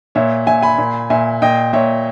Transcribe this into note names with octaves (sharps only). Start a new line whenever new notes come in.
A#2 C#5 E5
A#2 E5 G#5
G#5 B5
A#2
A#2 E5 G#5
A#2 D#5 G5
A#2 C#5 E5